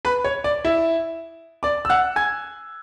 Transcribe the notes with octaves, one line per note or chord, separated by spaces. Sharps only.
B4 B5
C#5
D5
E4 E5
D5 D6
E6
F#5 F#6
G#5 G#6